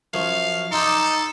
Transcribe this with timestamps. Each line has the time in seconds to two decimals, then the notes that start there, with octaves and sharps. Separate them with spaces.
0.13 F#2 F3 F5 C#6
0.72 D#4 A4 D5 G5 C6